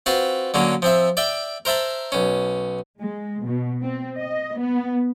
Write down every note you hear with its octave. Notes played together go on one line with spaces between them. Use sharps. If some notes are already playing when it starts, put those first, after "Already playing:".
C4 F4 F#4 B4 B5
D3 F#3 A#3 C#4
F3 C4 E5
D5 E5 G5
A#4 C5 E5 A5 B5
B1 C#4
G#3
B2
C4
D#5
B3